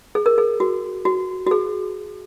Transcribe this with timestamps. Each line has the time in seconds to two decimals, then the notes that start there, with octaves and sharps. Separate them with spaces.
0.15 G#4
0.26 A#4
0.38 G#4
0.60 F#4
1.05 F#4
1.47 F#4
1.51 G#4